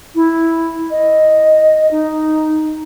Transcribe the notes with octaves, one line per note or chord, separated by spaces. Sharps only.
E4
D#5
D#4